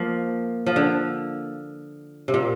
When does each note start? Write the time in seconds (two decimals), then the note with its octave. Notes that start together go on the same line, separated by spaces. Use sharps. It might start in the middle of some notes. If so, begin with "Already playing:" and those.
Already playing: F3 A#3
0.66 F3
0.76 D3
2.28 C3
2.34 A#2